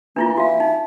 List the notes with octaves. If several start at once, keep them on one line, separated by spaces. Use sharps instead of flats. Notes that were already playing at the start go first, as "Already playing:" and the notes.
E3 A#3 D4 E4 F4
F#4 E5 F5
D#4